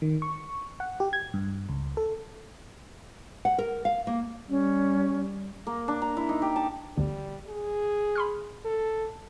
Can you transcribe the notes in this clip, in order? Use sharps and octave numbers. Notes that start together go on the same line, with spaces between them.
D#3
C#6
F#5
G4
G#6
G2
C#2
A4
F#5
A#4
F5
A#3
G3 C#4
A#3
D4
A#5
E4
D#4
G4
A5
G1 D2 D3 G3
G#4
B5 C6 F6
A4